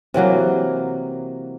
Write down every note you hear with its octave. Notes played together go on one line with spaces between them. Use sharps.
C3 E3 F#3 A#3